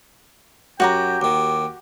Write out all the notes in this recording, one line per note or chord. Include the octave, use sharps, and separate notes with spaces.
F#2 F#4 G4 G5 A#5
D#2 D#3 D6